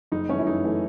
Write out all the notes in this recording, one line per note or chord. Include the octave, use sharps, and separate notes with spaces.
F#1 D#4
F#2 E3 A3 C#4
E4
F#1 D#4
E3 A3